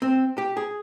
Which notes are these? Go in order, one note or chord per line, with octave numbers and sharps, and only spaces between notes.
C4
G4
G#4